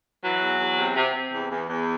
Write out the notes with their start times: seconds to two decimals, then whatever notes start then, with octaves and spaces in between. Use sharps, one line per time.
0.23 E3 F#3
0.41 E2
0.59 E2
0.77 C3
0.96 C3
1.14 C3
1.32 E2
1.50 E2
1.69 E2